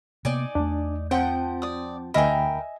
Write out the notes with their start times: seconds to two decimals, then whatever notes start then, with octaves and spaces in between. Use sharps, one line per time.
0.25 C3 A#3 B3 D#4 D5 G#5
0.55 E2 A3 D4
1.11 F3 C4 F#5 G5
1.62 D5 D#6
2.14 D2 A#4 D#5 E5 G5 G#5 B5